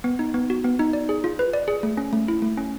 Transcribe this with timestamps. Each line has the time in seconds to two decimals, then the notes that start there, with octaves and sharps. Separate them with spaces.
0.04 B3
0.19 D#4
0.34 B3
0.50 F#4
0.64 B3
0.79 D#4
0.93 D5
1.09 G#4
1.24 F4
1.39 B4
1.53 D5
1.68 G#4
1.83 A3
1.97 C#4
2.13 A3
2.28 E4
2.42 A3
2.57 C#4